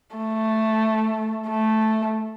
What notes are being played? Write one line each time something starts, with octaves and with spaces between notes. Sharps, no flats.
A3
A3